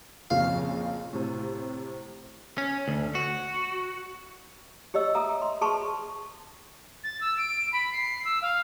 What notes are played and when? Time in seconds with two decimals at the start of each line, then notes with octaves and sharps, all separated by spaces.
0.30 F2 A#2 C#3 F5
1.13 A2 C3
2.58 C#4
2.88 D2
3.15 F#4
4.94 G4 C#5 D#5 E6
5.15 A4 E5 A#5 D#6
5.42 C6
5.61 G#4 A4 B4 A5 C6 C#6
7.04 A6
7.21 E6
7.38 D7
7.73 B5
7.92 C7
8.25 E6
8.42 F5